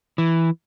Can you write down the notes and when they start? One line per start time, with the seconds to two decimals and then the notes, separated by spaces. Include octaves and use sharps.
0.18 E3